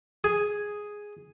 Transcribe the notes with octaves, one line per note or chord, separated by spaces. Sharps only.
G#4